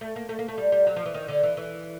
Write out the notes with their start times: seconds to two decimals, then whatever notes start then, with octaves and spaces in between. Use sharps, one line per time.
0.01 A3
0.16 A#3
0.29 A3
0.39 A#3
0.48 A3
0.58 G3
0.72 G3
0.87 F#3
0.96 F3
1.06 E3
1.14 D#3
1.28 D3
1.43 E3
1.57 E3